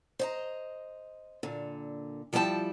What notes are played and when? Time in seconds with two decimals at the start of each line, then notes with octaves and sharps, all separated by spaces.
0.19 C5 D#5 A#5
1.43 A#2 D3
2.33 F3 G3 E4 A#4 G5 A5